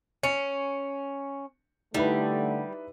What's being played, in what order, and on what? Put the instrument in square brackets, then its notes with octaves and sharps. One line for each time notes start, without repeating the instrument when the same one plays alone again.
[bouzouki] C#4 [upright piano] C#7
[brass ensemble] D3 A3 [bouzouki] G3 [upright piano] D#4 E4 B4